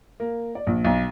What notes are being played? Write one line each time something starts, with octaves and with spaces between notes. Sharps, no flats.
A#3
D5
A#1
B1